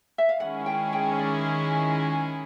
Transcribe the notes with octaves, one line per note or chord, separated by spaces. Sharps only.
E5
F5
D#3 G#3 C#4 E4 G#4 F#5
G5
G5
C#5
D5